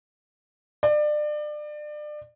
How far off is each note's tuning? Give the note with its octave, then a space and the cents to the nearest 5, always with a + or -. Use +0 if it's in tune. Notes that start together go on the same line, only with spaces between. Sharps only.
D5 +30